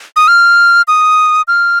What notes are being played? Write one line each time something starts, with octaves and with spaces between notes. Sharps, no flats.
D#6
F6
D#6
F6